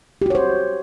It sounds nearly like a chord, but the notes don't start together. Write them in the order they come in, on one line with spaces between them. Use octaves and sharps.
G4 F#4 C#5 C5